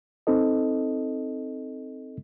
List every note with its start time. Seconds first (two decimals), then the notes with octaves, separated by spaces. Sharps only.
0.27 C4 D#4 A4 D#5